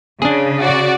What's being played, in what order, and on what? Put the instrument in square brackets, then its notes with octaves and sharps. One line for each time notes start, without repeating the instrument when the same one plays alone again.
[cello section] C#3 [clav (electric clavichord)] D4 G#4
[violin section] F#4 D5